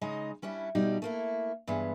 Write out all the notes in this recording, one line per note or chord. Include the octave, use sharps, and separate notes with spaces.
C#3 G#3 D#4 D#5
G3 C#4 D4 E4
B2 G3 D#4
A3 A#3 E4
G2 E3 G#3 B3